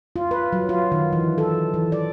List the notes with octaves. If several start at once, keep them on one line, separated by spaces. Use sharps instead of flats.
F4
B4
F#3
F4
D#3
E3
A4
E3
D5